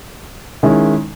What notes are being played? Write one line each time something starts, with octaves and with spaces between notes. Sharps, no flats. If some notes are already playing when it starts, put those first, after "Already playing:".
D#3 G#3 C#4 E4